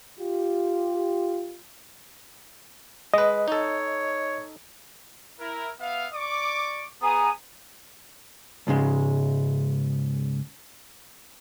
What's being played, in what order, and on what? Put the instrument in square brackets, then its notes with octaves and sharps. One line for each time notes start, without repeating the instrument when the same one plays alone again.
[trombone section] F4 G4
[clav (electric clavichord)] G#3 B4 [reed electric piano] D#5
[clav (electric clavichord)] D#4 A4 [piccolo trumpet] C#5
[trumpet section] E4 A#4
B3 E5 F5
D5 C#6 D6
[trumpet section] B3 G#4 [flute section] G#5 A#5 D#6
[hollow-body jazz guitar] C#2 G#2 C#3 G#3